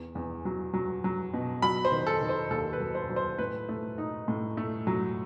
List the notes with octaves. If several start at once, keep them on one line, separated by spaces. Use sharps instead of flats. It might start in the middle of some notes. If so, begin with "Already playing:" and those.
Already playing: E2
E2
F#3
F#3
F#3
B2
F#3 B5
C5
D#3
A4
D#3
C5
D#2 A4
B4
F#3
C5
F#3
C5
A2 B4
A3
D#4
A2
A3
F#3